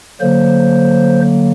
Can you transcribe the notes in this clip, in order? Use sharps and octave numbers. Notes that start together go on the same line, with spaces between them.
D3 F#3 A#3 C5